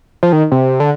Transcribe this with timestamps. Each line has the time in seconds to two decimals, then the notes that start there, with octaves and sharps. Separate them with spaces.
0.23 F3
0.32 D#3
0.52 C3
0.80 D3